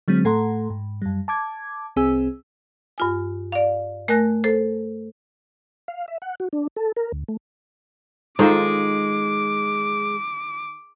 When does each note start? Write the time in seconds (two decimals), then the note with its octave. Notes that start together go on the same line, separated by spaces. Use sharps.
0.08 D3 F#3 G#3 C4
0.25 A2 A3 A4 F#5 A#5 C6
0.70 G#2
1.02 F#2 G3
1.28 A5 D6 G#6
1.96 C2 C4 G#4 G#5 E6
2.98 G2 F4 G#5
3.52 D5 F5
4.08 A3 A#4 G#5 F#6 A#6
4.44 A4 C5
5.88 F5
6.08 E5
6.22 F#5
6.40 F#4
6.53 D4
6.76 A4
6.96 A#4
7.12 D2
7.28 A3
8.39 D#3 G#3 D#4 F4 A4 C5 D6